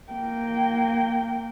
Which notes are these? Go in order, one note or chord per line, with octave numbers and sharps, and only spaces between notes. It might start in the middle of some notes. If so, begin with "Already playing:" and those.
A#3 G5